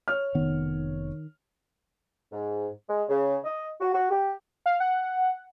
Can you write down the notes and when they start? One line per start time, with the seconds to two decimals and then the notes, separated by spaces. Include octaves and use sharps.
0.08 C#5 F6
0.35 F1 D#3 B3
2.32 G#2
2.88 G#3
3.09 C#3
3.44 D#5
3.80 F#4
3.93 F#4
4.09 G4
4.66 F5
4.80 F#5